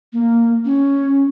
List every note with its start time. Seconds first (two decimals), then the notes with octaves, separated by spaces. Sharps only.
0.13 A#3
0.65 C#4